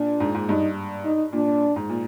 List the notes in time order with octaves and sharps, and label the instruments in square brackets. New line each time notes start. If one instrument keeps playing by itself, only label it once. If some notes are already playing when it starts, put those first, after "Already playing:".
Already playing: [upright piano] A#2 [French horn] D4
[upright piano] G#2
G#2
[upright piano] G2 [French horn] D#4
[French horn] D#4
[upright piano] A#2 [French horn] D4
[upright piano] G#2
A#2